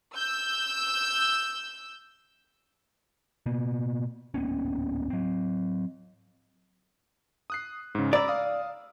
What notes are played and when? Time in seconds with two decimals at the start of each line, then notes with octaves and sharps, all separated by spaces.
0.17 E6 G6
3.46 B2 A#3 B3
4.34 D1 A#3 B3 C#4
5.10 F#3 C4
7.50 D#6 F#6 C7
7.95 G#2 C#3
8.13 D5 A#5 B5 E6
8.28 F5 D#6